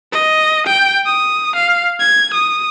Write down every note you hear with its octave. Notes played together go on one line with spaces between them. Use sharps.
D#5
G5
D#6
F5
G#6
D#6